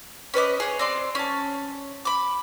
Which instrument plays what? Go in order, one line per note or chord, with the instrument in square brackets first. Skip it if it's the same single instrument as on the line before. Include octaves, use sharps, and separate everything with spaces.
[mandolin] C#4 B4 D#5 D6
G#4 C#5
C4 D5 C6
C#4 A5
B5 D6